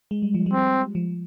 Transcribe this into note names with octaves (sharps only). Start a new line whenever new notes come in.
G#3
G3
F3
G3
C4
F3